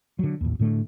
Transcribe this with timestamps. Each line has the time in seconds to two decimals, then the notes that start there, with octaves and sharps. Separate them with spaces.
0.19 D3 F#3
0.41 A1 D#2
0.59 A2 D3 A3